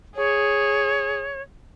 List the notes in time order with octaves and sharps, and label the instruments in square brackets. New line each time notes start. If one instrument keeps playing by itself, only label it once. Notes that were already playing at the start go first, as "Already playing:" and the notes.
[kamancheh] G#4 [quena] C#5